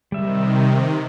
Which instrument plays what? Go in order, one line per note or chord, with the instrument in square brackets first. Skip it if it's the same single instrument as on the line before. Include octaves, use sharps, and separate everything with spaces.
[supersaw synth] C3 D#3 [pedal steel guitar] G3 E5